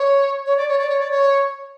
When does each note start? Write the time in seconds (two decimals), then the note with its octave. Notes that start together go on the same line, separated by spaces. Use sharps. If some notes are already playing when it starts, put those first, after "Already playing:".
Already playing: C#5
0.46 C#5
0.57 D5
0.69 C#5
0.79 D5
0.89 C#5
1.00 D5
1.11 C#5